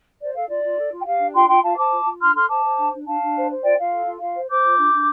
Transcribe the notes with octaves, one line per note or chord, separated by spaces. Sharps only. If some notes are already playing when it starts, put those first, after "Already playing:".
C5 D5
A4 F5
F4 D5
F4
A4
F4
G5
G4 F5
D4
F4 G5 C6
F4 G5 C6
F4 F5 A5
C5 A5 D6
F4
F4
D4 C6 F6
A4 C6 F6
C5 A5 D6
C5
D4
D4
D4 F5 A5
D4
C5
C5
F4 D5 G5
F4 F5
A4
F4
F4 F5
C5
C5 D6 G6
F4
D4
D4